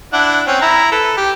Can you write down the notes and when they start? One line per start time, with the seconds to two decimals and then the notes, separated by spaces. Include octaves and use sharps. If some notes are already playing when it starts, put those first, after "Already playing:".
0.13 D4 E4 F#5
0.47 C4 C#4
0.62 E4 A#5
0.92 A4 B4
1.17 G4